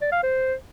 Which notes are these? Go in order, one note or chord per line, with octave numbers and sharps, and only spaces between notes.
D5
F5
C5